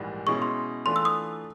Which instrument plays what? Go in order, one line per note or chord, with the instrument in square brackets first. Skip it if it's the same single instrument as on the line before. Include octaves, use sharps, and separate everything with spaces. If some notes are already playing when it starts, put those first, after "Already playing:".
Already playing: [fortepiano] A#1 G#2 E3 G3
[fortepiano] B2 G#3 C#4 E4 G#4 [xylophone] C#6
[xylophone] C6
[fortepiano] E3 A3 D4 F4 [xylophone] C6
[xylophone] E6
D#6